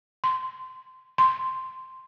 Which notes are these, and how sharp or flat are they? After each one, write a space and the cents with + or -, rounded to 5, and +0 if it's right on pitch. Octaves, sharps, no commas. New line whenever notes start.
C6 -20
C6 -5